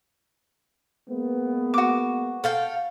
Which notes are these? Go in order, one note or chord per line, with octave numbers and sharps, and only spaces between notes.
G#3 A#3 B3
F#4 D6
A4 F5 G5